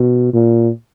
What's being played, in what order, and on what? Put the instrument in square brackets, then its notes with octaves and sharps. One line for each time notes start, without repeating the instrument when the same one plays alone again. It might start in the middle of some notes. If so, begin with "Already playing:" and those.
Already playing: [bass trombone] B2
A#2